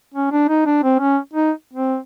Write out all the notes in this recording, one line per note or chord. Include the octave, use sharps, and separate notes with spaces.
C#4
D4
D#4
D4
C4
C#4
D#4
C4